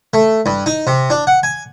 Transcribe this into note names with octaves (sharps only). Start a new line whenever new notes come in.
A3
G2
D#4
C3
D4
F#5
G#5